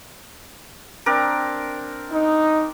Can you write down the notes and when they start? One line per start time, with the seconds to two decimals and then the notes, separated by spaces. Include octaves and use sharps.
1.06 C4 D4 A#4
2.11 D#4